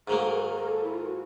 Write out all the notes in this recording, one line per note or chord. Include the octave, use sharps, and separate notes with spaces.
G#2 D#3 F#3 A#3 G#4
A4
A#4
A#4
A4
E4
F4
F#4